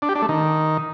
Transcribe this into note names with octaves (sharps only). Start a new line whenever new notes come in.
D4
G4
D4
A3
D#3